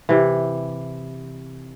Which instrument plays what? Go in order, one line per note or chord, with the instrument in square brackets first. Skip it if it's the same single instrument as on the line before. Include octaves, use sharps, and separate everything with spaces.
[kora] C3 E3